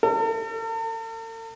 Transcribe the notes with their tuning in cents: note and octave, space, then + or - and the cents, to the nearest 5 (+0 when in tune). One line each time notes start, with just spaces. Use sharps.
A4 +45